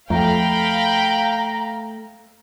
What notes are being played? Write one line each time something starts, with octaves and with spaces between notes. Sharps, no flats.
F2 A3 F5 G5 A#5 B5